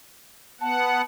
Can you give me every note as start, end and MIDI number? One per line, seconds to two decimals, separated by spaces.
0.61 1.02 59
0.61 1.02 78
0.61 1.03 81